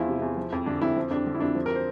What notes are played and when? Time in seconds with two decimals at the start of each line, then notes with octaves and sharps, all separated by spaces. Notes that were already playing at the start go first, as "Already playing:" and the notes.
Already playing: E2 F3 E4 F4
0.08 C3
0.22 E2
0.37 F3
0.52 F2
0.66 D3 D4
0.82 F2 E4
0.96 F3
1.11 F2 D4
1.27 D3
1.35 E4
1.40 F2 D4
1.55 F3
1.66 A#4
1.75 C5